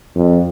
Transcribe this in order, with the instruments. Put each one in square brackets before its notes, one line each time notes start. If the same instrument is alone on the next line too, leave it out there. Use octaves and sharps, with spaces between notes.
[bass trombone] F2